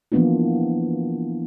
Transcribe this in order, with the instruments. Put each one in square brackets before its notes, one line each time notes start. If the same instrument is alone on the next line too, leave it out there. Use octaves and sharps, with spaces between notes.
[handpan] E3 F3 A#3 B3 D4 F4